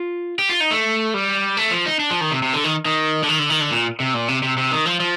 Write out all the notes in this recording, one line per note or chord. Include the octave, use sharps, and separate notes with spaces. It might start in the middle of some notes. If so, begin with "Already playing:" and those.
Already playing: F4
G4
F4
D#4
A3
G3
A3
F3
D#4
D4
F3
D#3
C3
C3
D3
D#3
D#3
D3
D#3
D3
D#3
D3
A#2
C3
A#2
C3
C3
C3
D#3
F3
F3